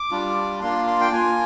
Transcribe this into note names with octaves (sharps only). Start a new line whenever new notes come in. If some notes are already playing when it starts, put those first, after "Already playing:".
Already playing: D6
G3 D4 F4
A#3 D4 F4 C6
C6
G5
A#3 F4 G#5